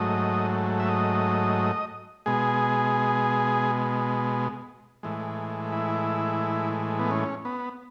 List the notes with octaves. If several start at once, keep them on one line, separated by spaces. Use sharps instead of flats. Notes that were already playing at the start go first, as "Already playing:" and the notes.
Already playing: G#2 F#3 A3 D#5
E5
D#5
B2 G#3 G#4
A2 E3 G#3
E4
B3
C#4
B3